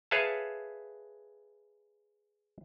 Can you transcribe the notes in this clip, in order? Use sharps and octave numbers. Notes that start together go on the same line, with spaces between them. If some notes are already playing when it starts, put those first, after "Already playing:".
G#4 B4 C#5 E5 F5 A5